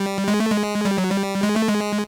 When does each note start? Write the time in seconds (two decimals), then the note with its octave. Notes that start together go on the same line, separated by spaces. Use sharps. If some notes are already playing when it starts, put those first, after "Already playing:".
Already playing: G3
0.28 G#3
0.40 A3
0.51 G#3
0.85 G3
0.98 F#3
1.11 G3
1.43 G#3
1.56 A3
1.68 G#3